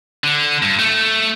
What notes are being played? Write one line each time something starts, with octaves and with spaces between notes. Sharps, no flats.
D3
G2
A3